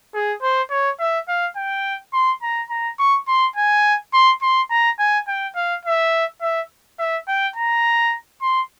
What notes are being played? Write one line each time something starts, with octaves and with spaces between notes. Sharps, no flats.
G#4
C5
C#5
E5
F5
G5
C6
A#5
A#5
C#6
C6
G#5
C6
C6
A#5
G#5
G5
F5
E5
E5
E5
G5
A#5
C6